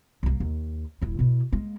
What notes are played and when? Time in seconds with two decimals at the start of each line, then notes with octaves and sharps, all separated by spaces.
0.23 C2 A#3
0.40 D#2
1.02 D#1 E4
1.19 B2 E4
1.52 G#3 A#3